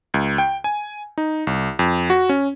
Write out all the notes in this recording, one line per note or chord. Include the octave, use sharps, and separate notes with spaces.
C#2
G5
G#5
D#4
C2
F2
F#4
C#4